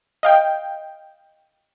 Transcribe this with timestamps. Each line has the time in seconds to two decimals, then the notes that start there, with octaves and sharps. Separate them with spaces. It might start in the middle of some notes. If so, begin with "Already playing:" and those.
0.23 D#5 F5 G5